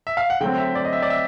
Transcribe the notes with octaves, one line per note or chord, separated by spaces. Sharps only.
E5
F5
F#5
D3 F#3 A3 C4 G5
E5
D5
D#5
E5
D5
E5